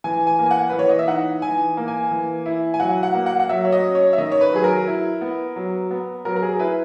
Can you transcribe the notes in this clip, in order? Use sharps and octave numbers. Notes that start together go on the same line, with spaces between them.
E3 G#5
G#5
A#3
G#5
F#5
E3 B4
C#5
D#5
E5
D#4 F#5
E3 G#5
A#3
G#5
E3
E4
G#5
F#3 F#5
F#5
A#3
F#5
F#5
F#3 E5
C#5
D#5
C#4
C#5
E5
D#3 D#5
C#5
B4
F#3 G#4
A#4
E4
B3
F#3
B3
F#3 A#4
A#4
G#4
E4 B4